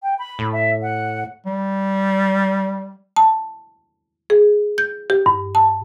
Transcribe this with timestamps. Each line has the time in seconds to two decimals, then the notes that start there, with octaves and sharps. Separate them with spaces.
0.02 G5
0.18 B5
0.39 A2
0.53 E5
0.82 F#5
1.46 G3
3.16 A5
4.30 G#4
4.78 G6
5.10 G4
5.26 G2
5.55 A5